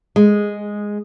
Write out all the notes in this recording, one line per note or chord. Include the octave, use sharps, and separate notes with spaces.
G#3